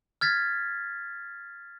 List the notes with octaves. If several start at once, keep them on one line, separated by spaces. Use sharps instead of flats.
F6 G#6 A6 B6